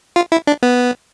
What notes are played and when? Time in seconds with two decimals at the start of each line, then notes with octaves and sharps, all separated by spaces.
0.16 F4
0.32 E4
0.47 D4
0.63 B3